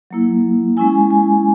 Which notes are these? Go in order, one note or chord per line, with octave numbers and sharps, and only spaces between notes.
F#3 A#3 E4
G#3 C#4 E4 G#5
G#5